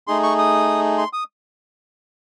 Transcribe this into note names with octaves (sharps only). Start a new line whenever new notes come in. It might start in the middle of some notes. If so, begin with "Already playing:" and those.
A3 D#4 G#4 C6
C#6
D#6
C6
D#6